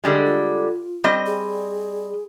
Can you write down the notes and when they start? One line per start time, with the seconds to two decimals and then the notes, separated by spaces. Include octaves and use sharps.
0.04 D3 G3 G#3
0.26 F4
1.04 G3 C4 D#5
1.26 G#4